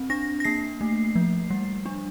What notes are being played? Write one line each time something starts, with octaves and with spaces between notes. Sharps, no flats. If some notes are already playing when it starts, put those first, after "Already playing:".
Already playing: C4
D4 A#6
A#6
A#3 C7
A3
F3
G3
D4